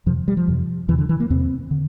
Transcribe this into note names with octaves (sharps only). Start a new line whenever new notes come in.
F2 C3 F3
G3
F3
F2 C3
E2 C3 E3
D3
E3
A#3
E2 C3 C4
D3